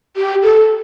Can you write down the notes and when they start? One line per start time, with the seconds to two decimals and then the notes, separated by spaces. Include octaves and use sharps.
0.16 G4
0.43 A4